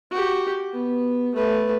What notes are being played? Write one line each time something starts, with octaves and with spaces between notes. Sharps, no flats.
F#4 G4
B3
A3 B4